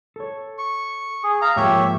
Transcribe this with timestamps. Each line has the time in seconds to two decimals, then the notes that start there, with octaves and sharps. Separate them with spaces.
0.16 A4 C#5
0.58 C#6
1.23 G#4
1.42 F5 A#5
1.56 G#2 F3 A#3 G4 C#5 E5